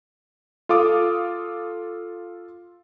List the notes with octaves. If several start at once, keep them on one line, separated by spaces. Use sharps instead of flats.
F4 A4 F5 D6 D#6